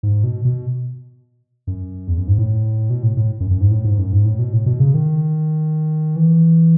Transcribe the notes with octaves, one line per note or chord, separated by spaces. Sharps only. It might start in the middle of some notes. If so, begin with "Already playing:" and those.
G#2
B2
B2
F#2
E2
F#2
G#2
A2
B2
A2
A2
F#2
F#2
G#2
A2
G#2
F#2
G#2
A2
B2
A2
B2
C#3
D#3
E3